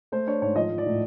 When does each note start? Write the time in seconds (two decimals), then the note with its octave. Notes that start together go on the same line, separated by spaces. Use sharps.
0.12 A3 C5
0.27 D4 C#5
0.42 G#2 C#5
0.56 F3 D#5
0.70 F3
0.78 D5
0.86 A2